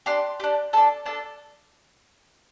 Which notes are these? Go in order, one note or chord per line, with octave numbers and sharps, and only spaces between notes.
D4 G4 C6
D4 G4
D4 A4 A5
D4 A4 A5